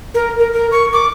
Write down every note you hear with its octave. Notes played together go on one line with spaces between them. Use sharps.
A#4
A#4
A#4
C#6
D6